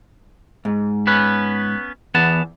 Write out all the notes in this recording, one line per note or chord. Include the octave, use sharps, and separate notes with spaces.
G#2
B3 C#4 B4
E2 B3 F#5 A5